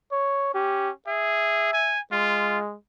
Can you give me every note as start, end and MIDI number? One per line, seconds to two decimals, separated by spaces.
0.12 0.50 73
0.54 0.92 61
0.54 0.90 67
1.08 1.71 68
1.08 1.96 76
1.73 2.00 80
2.12 2.76 56
2.12 2.59 65